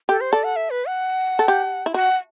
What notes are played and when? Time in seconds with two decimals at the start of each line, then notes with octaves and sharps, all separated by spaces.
0.09 G4 A4
0.21 C5
0.32 A4 D5
0.44 F#5
0.56 E5
0.70 B4
0.86 F#5
1.39 A4
1.48 G4
1.86 E4
1.94 F#4 F#5